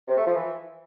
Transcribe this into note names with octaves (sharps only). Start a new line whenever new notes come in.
C3
A3
F3
E3